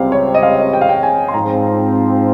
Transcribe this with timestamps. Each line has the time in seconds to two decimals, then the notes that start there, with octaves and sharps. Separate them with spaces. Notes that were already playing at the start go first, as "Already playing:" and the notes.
Already playing: C#2 C3 G3 C4 F5
0.12 C#5
0.34 D#5
0.43 F5
0.73 G5
0.81 F5
0.89 G5
1.03 G#5
1.28 C6
1.34 G#2 F3 C4 F4 A#5